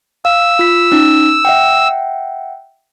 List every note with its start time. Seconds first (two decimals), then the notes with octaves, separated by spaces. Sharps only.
0.25 F5 E6
0.59 F4 B6
0.92 C#4 D#4
1.45 E5 F#5 G5